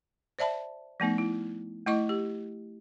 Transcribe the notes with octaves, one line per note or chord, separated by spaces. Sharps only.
C5 D5 E5 A5 B5
F3 A3 B3 D#4
E4
A3 E4 D#5 C#6
G4